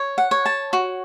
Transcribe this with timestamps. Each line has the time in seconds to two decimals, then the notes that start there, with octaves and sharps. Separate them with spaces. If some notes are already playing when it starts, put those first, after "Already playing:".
Already playing: C#5
0.18 F#5
0.31 C#5
0.46 A5
0.73 F#4